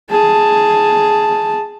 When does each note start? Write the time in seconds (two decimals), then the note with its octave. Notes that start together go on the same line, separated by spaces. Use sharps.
0.10 G#4 A5